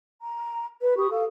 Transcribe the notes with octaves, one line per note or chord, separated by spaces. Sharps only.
A#5
B4
G4 B5 C#6 D#6
A4 F5